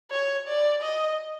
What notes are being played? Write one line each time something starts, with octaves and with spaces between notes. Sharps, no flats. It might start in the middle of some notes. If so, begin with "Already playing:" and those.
C#5
D5
D#5